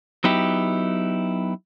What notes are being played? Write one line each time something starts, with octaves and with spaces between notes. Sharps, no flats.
F#3 B3 D#4 E4 G4